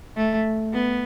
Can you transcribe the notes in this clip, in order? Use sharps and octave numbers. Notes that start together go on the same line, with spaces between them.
A3
B3